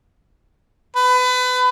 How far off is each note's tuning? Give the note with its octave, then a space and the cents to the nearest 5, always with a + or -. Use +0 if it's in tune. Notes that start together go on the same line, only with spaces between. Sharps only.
B4 +30